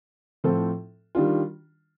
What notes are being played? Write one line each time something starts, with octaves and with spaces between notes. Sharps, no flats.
A2 F3 C4 F4 A4
D#3 G3 D4 F4